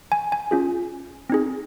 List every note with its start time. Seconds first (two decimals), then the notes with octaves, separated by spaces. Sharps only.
0.12 G#5
0.32 G#5
0.51 C#4 F4 G#4
1.30 C4 D#4 G#4